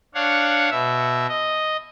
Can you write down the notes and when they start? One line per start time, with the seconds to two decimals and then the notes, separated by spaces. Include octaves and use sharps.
0.15 D4 C#5 F5 F#5
0.71 B2 E5
1.29 D#5